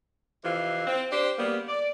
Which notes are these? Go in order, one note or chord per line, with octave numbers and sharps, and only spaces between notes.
F2 C3 E3 F5
C4
D4 G4 C5
C#3 G3 A#3 B3
D5